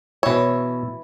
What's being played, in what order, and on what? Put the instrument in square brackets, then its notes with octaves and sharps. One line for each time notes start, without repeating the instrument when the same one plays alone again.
[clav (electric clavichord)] B2 E5 [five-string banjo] E3 C#5